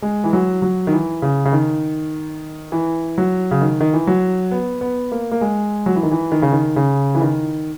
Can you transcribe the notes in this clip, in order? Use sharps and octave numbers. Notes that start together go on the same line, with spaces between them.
G#3
E3
F#3
F#3
D#3
E3
C#3
C#3
D#3
E3
F#3
C#3
D#3
D#3
E3
F#3
B3
B3
A#3
A#3
G#3
F#3
E3
D#3
E3
D#3
C#3
D#3
C#3
E3
D#3